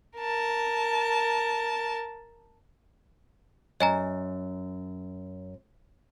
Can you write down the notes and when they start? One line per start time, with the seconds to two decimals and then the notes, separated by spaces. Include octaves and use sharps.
0.18 A#4 A5
3.80 F#2 D#5 G#5 A#5